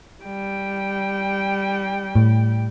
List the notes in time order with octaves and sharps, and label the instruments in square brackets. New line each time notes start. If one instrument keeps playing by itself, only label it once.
[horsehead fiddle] G3 G5
[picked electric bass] A2